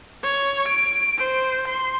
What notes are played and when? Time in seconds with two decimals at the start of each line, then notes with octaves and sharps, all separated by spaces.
0.23 C#5
0.69 D7
1.17 C5
1.68 C6